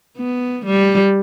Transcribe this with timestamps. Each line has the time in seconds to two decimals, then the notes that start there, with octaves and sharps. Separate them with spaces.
0.18 B3
0.66 G3